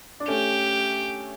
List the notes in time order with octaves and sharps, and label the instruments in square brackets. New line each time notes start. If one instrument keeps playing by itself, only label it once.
[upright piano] D4
[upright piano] A3 C#4 [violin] G4